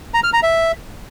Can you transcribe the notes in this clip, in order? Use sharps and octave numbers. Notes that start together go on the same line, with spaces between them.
A#5
F6
A#5
E5